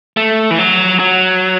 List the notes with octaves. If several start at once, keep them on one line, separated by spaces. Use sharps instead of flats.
A3
E3
F#3
F#3